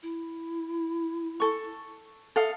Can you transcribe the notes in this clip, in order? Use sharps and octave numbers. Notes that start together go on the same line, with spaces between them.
E4
A4 C#6
A4 E5 F5 D#6